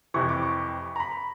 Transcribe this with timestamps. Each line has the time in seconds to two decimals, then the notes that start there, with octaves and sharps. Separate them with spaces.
0.14 F2 C3 E3 C#6
0.29 D6
0.43 C#6
0.96 A#5
1.00 B5